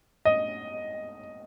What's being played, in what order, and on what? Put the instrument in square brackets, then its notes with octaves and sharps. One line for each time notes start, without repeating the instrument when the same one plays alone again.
[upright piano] D#5